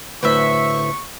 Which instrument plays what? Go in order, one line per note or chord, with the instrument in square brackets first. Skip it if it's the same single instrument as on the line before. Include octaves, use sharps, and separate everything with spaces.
[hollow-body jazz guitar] D2 A2 [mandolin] B4 C5 E5 [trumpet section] C#6